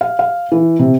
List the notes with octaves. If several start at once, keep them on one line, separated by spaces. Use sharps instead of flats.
F5
F5
E3
C3